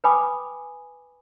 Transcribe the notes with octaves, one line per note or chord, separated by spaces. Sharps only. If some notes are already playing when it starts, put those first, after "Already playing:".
B4 G5 G#5 B5 D6 D#6